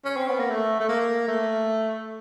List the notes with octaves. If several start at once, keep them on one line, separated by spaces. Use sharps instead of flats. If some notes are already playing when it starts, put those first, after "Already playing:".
C#4
C4
B3
A#3
A3
A3
A#3
A3